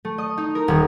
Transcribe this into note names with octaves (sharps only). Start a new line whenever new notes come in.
A3
D#5
D#4
A#4
D#1